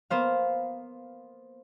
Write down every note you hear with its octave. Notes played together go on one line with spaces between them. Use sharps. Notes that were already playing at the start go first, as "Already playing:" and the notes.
A#3 B3 C5 F5